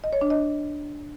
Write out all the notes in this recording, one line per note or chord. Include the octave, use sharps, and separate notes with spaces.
D#5
C#5
D4
D#5